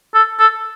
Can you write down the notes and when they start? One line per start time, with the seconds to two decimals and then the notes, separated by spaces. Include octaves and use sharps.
0.15 A4
0.39 A4